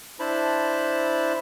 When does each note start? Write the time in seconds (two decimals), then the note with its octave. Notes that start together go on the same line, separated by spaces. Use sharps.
0.20 D4 E4 C5 A5 B5